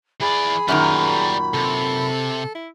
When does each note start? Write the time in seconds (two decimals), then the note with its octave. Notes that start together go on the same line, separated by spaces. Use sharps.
0.21 E3 G#4 D5 B5
0.68 F#2 A#2 D#3 G3 G#4 A#5
1.54 C3 A4
2.55 E4